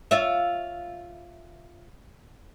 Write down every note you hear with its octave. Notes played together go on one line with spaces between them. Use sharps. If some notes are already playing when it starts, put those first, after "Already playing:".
F4 C#5 E5